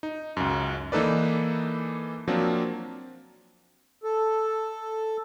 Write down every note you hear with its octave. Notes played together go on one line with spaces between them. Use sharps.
D#4
C#2 F#2
E3 A#3 D#4 A4 B4 D5
F3 F#3 A#3 C4 D4 F4
A4